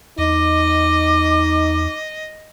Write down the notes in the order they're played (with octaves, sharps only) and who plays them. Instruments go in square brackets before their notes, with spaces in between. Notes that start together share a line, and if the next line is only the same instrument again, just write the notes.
[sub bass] E2 [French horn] D#4 [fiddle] D#5 [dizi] D6